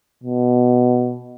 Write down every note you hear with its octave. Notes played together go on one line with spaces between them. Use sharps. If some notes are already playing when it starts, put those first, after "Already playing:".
B2